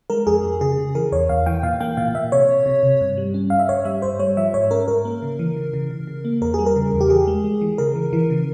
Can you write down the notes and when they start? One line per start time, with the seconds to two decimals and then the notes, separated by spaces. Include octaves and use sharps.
0.10 G#3 A#4
0.27 F2 G#4
0.44 F2
0.61 C#3 G#4
0.78 C#3
0.95 E3 A#4
1.12 E2 C#5
1.29 E2 F5
1.46 E3 G5
1.63 A#2 F5
1.80 A#3 G5
1.97 A#2 F5
2.15 A#2 E5
2.32 C3 C#5
2.49 C3
2.66 C3
2.83 C3
3.01 G2
3.17 G3
3.34 C#4
3.50 G2 F5
3.59 E5
3.69 G2 C#5
3.85 G3 E5
4.02 G2 C5
4.19 G3 C#5
4.37 F3 E5
4.54 G#2 C#5
4.71 C#4 A#4
4.88 G#2 A#4
5.05 A#3
5.22 C#3
5.39 E3
5.57 C#3
5.74 C#3
5.91 C#3
6.07 C#3
6.25 A#3
6.41 E2 A#4
6.54 G3 G#4
6.66 A#4
6.76 C#3
6.93 E2
7.01 G4
7.10 E3 G#4
7.28 G#3
7.44 G#3
7.62 E3
7.78 C#3 A#4
7.96 E3
8.13 E3
8.30 C#3